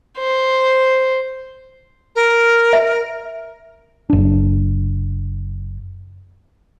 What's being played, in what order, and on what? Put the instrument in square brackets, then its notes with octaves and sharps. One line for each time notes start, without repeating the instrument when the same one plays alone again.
[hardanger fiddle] C5
[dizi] A#4
[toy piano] E5
[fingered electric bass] F#1 D4